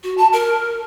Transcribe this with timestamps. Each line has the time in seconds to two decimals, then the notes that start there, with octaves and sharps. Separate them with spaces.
0.03 F#4
0.18 A5
0.33 A#4